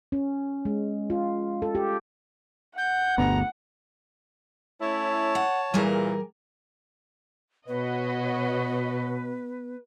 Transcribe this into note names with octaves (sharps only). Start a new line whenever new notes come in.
C#4
G#3
F4
A4
G4
F#5 G6
G1 D2 B3 A#5
A3 C#4 E4 C#5 A5
F#5
A#2 E3 G3 G#4 A#4
B2 B3 F#4 B4 C#5 D#5